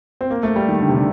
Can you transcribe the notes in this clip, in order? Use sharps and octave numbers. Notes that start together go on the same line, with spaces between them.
C4
A#3
A3
G3
D#3
D3
C3
D3